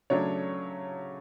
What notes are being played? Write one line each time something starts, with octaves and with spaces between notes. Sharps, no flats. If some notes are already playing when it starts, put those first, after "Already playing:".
C#3 F#3 A3 D4 C#5